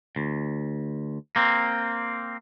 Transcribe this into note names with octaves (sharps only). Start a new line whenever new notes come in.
D2
A#3 C4